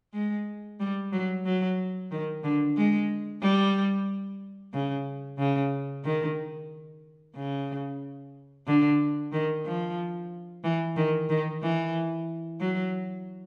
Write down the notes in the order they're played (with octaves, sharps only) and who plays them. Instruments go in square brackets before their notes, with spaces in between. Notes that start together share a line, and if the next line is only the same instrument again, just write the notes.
[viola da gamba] G#3
G3
F#3
F#3
D#3
D3
G#3
G3
C#3
C#3
D#3
C#3
D3
D#3
F3
E3
D#3
D#3
E3
F#3